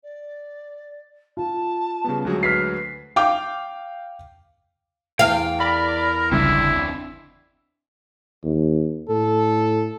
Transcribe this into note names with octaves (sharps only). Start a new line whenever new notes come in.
D5
F4 A5
C#3 G3 B3
D2 F#3 G#3 G#4
B4 F6 B6 C7
F5 G5 D6
E2 F5 G5
A#4 D5 B5
G1 C#2 C4 D4 E4 E5
D#2
A2 A4